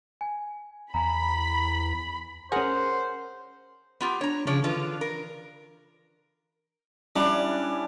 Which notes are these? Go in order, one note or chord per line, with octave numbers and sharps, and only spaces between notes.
G#5
E2 G#5 A#5 B5
C#4 G#4 A#4 C5 F#5
B3 F4 G4
D4 C#5 A#5
C#3 F3 C#5 D5
D3 E3 F4
A#4
G3 C#4 D4 E4